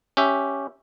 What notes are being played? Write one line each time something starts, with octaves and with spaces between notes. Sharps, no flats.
C#4 G4 E5